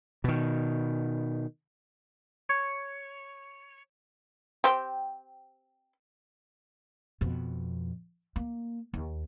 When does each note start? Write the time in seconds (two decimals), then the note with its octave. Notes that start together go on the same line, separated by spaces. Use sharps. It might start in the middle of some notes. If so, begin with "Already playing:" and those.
0.24 B2 D#3
2.49 C#5
4.64 C4 G4
7.21 F2 B2
8.36 A#3
8.94 D#2